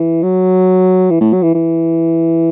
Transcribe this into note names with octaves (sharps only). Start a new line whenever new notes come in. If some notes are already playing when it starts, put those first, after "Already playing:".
Already playing: E3
F#3
E3
A2
F#3
E3
E3